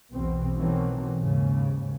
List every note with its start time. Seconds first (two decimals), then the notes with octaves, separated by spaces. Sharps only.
0.12 B1 E2 B2 C4
0.58 B2 D#3 E3 F#3 A3 C4
1.17 D#2 G#2 C#3